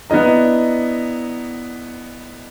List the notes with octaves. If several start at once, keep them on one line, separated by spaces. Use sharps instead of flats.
B3 D4 E4 D#5 A#5